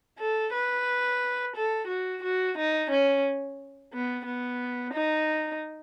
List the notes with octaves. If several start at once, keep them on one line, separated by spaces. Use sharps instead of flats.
A4
B4
A4
F#4
F#4
D#4
C#4
B3
B3
D#4